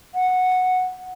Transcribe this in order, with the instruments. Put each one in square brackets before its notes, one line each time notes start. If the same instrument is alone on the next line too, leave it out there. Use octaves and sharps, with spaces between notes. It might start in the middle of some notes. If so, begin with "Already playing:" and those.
[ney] F#5